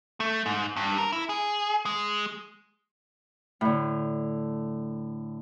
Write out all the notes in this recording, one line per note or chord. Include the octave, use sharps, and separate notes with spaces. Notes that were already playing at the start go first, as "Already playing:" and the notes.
A3
G#2
G2
A#4
E4
G#4
G#3
A2 D3